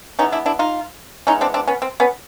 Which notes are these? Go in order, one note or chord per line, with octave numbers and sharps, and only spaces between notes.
E3 G#3 B3 C#4 D#4
D4 E4
D4 E4
D#4 F4
E3 G#3 B3 C#4 D#4
C4 D4
C4 D4
B3 C#4
C4
B3 C#4